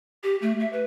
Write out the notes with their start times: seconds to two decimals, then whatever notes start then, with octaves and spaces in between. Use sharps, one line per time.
0.23 G4
0.42 A3
0.60 E5
0.73 B4